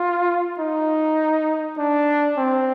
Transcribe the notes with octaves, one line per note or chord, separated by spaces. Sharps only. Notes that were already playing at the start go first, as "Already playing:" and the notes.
Already playing: F4
D#4
D4
C4